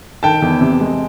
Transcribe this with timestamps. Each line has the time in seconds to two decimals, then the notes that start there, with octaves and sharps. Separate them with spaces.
0.23 D#3 G5 A5
0.42 E2
0.61 C3
0.81 G#3